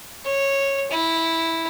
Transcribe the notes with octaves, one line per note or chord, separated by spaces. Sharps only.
C#5
E4